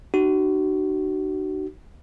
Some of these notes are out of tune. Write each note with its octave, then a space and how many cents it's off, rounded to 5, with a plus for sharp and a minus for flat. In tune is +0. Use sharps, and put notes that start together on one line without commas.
D#4 -45 F#4 +35